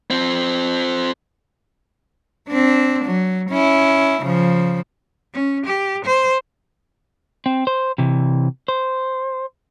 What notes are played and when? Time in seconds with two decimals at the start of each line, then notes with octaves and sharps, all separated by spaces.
0.10 F3 C4
2.48 C4 D4
3.05 F#3
3.51 C#4 E4
4.23 C#3 F3
5.34 C#4
5.66 G4
6.05 C5
7.46 C4
7.67 C5
7.98 C3 E3
8.68 C5